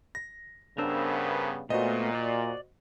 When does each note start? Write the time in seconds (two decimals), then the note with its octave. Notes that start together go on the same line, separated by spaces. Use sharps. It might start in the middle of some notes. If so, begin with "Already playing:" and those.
0.15 A#6
0.78 G2 C#3 B3 D4 A#4 C5 E6
1.70 A#2 A3 B3 F#4 C5 D#5
2.15 D5